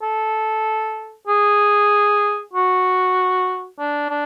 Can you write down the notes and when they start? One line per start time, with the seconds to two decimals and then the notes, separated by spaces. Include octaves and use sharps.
0.02 A4
1.28 G#4
2.53 F#4
3.79 D4
4.10 D4